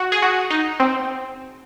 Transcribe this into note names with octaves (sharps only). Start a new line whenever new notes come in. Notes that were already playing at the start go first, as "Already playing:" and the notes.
Already playing: F#4
G#4
F#4
D#4
C4